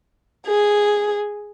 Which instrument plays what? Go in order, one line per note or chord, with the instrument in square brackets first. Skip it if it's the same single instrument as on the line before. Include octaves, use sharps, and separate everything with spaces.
[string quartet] G#4